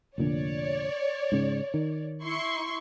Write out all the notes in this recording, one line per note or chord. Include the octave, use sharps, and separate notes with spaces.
F1 A#2 D3 C#5 D5
G#2 C#3
D#3
E4 C6 C#6